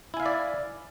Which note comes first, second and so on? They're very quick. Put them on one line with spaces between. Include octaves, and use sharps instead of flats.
E4 G#5 F5 E5 D5